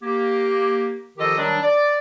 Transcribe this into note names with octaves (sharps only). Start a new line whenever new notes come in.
A#3 G4
D#3 F3 F4 G4 A4 D#5
D#3 F#3 G3 D4
D5